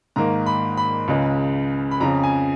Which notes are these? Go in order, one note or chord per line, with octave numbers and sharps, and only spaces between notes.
G#2 D#3 A#3 A#5
B5
B5
C#2 C#3 G#3
B5
F2 C#3 F3 A#5
G#5